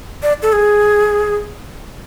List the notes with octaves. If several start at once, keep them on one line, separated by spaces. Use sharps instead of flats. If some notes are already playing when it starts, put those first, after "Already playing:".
D5
A4
G#4